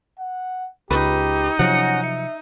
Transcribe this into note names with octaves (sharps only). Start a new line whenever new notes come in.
F#5
C#2 D#4 G4 B4
C3 F3 F#3 C#4 F#5 A#6 C#7
E5 C#7